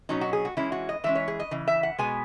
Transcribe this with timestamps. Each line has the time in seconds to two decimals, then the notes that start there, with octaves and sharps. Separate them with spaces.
0.09 B2 F#3 C#4 D#4
0.21 F#4
0.33 G#4
0.45 F#4
0.57 E3 G#3 C#4 E4
0.72 F#4
0.89 D#5
1.04 E3 G#3 C#4 E5
1.15 C#5
1.28 G#4
1.40 D#5
1.51 C#3 E3
1.68 E5
1.83 F#5
1.99 B2 G#3 B3 G#5